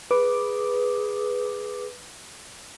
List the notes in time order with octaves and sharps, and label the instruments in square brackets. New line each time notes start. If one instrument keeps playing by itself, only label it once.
[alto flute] G#4 [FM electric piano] B4 D6